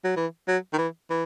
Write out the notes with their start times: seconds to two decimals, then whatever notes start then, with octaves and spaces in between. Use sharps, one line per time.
0.05 F#3
0.17 E3
0.48 F#3
0.73 D#3
0.78 E3
1.10 E3